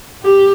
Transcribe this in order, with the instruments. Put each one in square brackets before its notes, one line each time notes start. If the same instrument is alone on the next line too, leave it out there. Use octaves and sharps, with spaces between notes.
[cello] G4